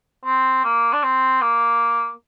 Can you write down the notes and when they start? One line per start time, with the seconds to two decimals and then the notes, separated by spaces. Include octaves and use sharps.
0.25 C4
0.64 A#3
0.93 D4
1.04 C4
1.42 A#3